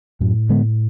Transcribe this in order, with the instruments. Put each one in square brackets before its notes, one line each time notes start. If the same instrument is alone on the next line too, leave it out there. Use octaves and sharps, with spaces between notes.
[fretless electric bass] F#2 [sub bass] A2
[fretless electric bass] D3 G#3 B3